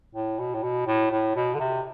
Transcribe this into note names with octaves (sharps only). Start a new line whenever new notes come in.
A2
B2
A2
B2
A2
A2
B2
D3
C3